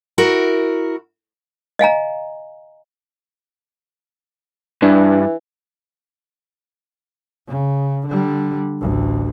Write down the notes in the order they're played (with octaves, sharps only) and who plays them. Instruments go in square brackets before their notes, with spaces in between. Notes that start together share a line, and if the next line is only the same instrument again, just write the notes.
[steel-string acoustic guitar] E4 F#4 A#4
[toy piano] D#5 F5 G#5 A#5
[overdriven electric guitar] G2 [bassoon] E3 [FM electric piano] D4
[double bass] C#3
D3 G3
A1 D2